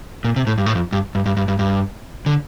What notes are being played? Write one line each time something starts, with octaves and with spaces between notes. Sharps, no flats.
A#2
C3
A2
G2
A2
F2
G2
G2
G2
G2
G2
G2
D3